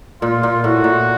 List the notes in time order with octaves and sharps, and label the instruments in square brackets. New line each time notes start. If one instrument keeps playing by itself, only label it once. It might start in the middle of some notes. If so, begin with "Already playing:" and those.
[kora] A#2 [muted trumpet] F4
[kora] A#2
[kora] A2 [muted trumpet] F#4
[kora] A#2